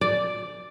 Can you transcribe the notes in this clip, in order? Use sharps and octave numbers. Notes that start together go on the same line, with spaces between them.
D5